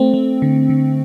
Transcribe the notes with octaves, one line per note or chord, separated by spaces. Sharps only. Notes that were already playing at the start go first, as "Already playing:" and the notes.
Already playing: A3 C4
A3
D3
D3